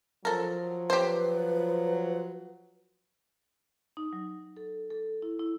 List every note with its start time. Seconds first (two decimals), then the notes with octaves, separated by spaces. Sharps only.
0.25 F3 F#3 A4 A#4
0.90 G4 B4 C5
3.97 D#4
4.13 F#3
4.57 A4
4.90 A4
5.22 E4
5.40 E4